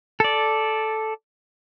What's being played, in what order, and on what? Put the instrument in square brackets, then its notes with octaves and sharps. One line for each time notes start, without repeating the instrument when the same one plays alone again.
[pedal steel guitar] A4 D5